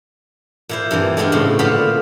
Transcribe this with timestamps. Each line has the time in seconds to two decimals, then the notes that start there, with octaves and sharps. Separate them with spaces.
0.69 A#2 E4 C5
0.91 G2 E3 A#3 C4
1.17 G#3 A3 B3 C4 D4 F4
1.32 A2 C#3
1.59 A#2 D3 B3 F4 C5 B5